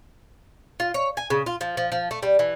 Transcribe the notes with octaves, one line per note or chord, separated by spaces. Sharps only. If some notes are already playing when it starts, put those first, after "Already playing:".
F4
C#5
G#5
C#3
F4
F3
F3
F3
A3
G3
E3